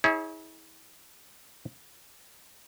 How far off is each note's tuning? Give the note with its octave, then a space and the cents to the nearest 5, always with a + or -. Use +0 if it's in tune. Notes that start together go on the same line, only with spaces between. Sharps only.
E4 -40 G#4 +5 C#5 +0